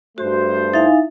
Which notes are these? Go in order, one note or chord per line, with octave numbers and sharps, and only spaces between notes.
G2 A3 F#4 C5
D#4 E4 E5 F5 G#5 A6